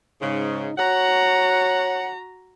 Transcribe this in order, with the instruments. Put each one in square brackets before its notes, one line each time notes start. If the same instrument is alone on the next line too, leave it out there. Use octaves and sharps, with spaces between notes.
[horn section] G#2 C#3 [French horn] D#4
[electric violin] F#4 A#5 [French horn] C#5 [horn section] F#5